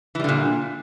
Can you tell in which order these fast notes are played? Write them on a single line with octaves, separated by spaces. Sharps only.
E3 G3 D3 A#2